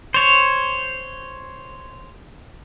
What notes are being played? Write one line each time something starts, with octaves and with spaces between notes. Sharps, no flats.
C5 C#5